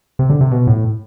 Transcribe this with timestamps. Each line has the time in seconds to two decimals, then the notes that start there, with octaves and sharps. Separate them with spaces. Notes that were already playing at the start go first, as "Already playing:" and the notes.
0.19 C3
0.30 D3
0.41 C3
0.51 B2
0.67 A2